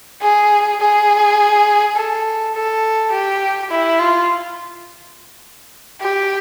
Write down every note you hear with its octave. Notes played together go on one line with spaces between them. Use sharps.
G#4
G#4
A4
A4
G4
E4
F4
G4